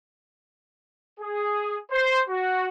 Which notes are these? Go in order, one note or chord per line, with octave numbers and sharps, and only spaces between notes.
G#4
C5
F#4